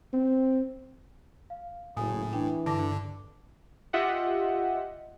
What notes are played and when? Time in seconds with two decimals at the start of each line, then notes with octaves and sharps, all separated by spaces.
0.13 C4
1.50 F5
1.97 F#1 A2 G#5 D#6
2.33 E3 D4 G5
2.66 G2 D3 A5 D6 A#6
3.93 F4 G4 D#5 E5 F#5